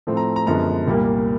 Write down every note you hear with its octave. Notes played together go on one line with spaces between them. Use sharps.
A2 F3 A3 C4
A#5
A#5
F#2 D3 F3 G#3 B3 A#5
C2 A#2 G3 A#3